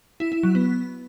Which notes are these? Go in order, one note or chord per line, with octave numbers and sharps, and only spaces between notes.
E4
E4
F#3
B3